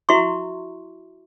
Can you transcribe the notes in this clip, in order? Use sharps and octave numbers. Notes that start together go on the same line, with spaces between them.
E4 F#4 E5 A#5 C6 C#6